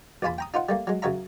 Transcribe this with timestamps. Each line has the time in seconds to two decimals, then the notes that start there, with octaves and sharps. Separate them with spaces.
0.22 A#1 E2 F4 G#5 A5 B5
0.38 G5 A#5 D#6
0.54 D#4 F4 C5 F#5
0.69 G3 A3 A#3
0.87 F#3 G#3
1.02 F#2 C#3 F#3 C#5 E5 A#5